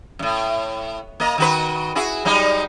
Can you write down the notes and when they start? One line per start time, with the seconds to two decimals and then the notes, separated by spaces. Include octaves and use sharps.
0.19 F#2 A2
1.20 A#3 D#5
1.38 D#3 F#4 B4
1.95 E4 F#4 G#4
2.25 F#3 G3 D#4